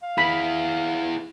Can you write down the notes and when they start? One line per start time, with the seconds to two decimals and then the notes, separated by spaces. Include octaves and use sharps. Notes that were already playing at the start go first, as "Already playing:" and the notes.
0.03 F5
0.18 E4 G#4 B5